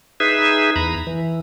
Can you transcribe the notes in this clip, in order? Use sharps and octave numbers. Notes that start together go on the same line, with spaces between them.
D#4 G#4 B4 E5
E2 A#5 B5
E3